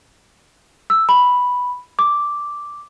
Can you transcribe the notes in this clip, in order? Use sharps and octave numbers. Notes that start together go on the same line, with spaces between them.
E6
B5
D6